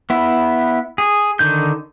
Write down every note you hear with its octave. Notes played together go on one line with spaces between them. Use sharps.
B3 E4
G#4
D3 D#3 G6